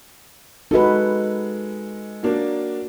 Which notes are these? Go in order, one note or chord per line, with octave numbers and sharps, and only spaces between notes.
G#3 D#4 F#4 A4 B4
F#3 A#3 D4